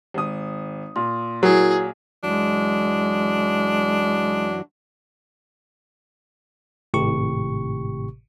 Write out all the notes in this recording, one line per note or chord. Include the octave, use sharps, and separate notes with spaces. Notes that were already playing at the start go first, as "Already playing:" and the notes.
G#1 D#6
A#2 C6
F#3 E4 F#4 G#4 A#4
F#2 E3 F#3 G#3 D4
G#1 A2 C3 G4 C#6